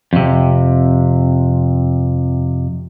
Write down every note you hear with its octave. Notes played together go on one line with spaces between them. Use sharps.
F2 C3